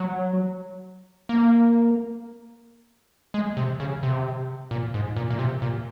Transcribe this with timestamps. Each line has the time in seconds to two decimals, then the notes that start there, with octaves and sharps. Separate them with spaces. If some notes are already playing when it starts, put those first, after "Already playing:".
Already playing: F#3
1.29 A#3
3.34 G#3
3.57 C3
3.80 C#3
4.03 C3
4.71 A#2
4.94 G#2
5.16 A#2
5.30 A#2
5.39 C3
5.62 A#2